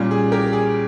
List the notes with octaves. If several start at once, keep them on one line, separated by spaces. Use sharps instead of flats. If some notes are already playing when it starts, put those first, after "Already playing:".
Already playing: A#2 G3 C#4
G#4
G4 A#4
G#4